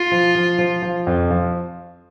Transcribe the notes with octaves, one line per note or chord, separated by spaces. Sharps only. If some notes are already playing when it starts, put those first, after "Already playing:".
Already playing: F4
F3
F3
F3
F3
F2
F3